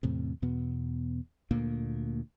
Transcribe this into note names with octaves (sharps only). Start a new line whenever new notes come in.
E2 A2 C3
E2 B2 B3
D2 A#2 A#3